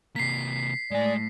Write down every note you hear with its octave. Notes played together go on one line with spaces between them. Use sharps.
C3 A#3 B6 C7
A2 G#3 D5 G#5